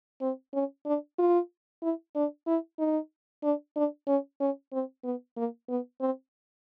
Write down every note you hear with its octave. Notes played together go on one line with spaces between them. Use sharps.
C4
C#4
D4
F4
E4
D4
E4
D#4
D4
D4
C#4
C#4
C4
B3
A#3
B3
C4